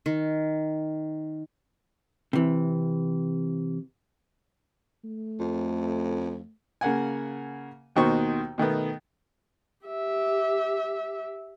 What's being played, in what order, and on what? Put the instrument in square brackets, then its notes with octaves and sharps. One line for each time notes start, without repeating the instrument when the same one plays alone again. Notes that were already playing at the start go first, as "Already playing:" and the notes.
[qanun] D#3
[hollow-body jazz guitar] C3 E3
[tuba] A3
[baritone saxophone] F2
[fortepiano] C#3 A#3 F#5 G#5
D#2 B2 D#3 F#4 C5 C#6
B2 D#3 A3 B3
[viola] G4 E5